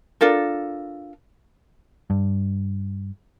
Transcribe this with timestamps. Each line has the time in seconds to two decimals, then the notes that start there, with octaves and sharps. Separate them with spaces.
0.21 D4 F4 A4 A#4
2.10 G2